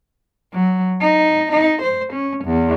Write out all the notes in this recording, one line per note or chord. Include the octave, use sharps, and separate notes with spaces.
F#3
D#4
D#4
C5
C#4
E2